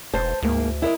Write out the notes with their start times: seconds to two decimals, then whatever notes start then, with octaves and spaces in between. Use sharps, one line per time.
0.14 E1 C5 A5
0.42 D2 G#2 A#3
0.82 E4 A#4 D#5